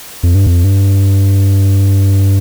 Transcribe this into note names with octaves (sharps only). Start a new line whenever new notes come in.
F2
G2
F2
G2